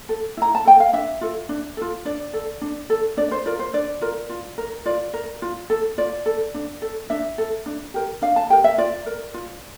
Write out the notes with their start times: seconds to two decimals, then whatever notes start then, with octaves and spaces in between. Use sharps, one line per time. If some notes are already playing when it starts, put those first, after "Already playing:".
0.09 A4
0.37 E4 A#5
0.55 A5
0.65 A4 G5
0.80 F5
0.93 D4 E5
1.21 F4 A4
1.49 D4
1.77 F4 A4
2.05 D4 D5
2.33 A4
2.61 D4
2.90 A4
3.17 D4 D5
3.31 C5
3.46 F4 A#4 D5
3.59 C5
3.73 D4 D5
4.01 F4 A#4
4.29 F4
4.58 A#4
4.86 F4 D5
5.14 A#4
5.42 F4
5.70 A4
5.98 F4 D5
6.26 A4
6.54 D4
6.82 A4
7.10 D4 E5
7.38 A4
7.66 D4
7.94 G4 A#4
8.22 D4 F5
8.36 A5
8.50 G4 A#4 G5
8.64 E5
8.78 F4 D5
9.06 A#4
9.34 F4